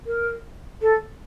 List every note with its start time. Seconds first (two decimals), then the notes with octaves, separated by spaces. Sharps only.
0.06 A#4
0.81 A4